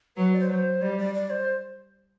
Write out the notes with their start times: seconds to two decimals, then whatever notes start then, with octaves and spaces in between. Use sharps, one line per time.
0.17 F#3 B4
0.33 D5
0.40 C5
0.47 F#3 B4
0.54 C5
0.81 G3 D5
0.98 D5
1.15 D5
1.30 C5